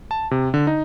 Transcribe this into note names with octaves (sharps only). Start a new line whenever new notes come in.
A5
C3
D3
D#4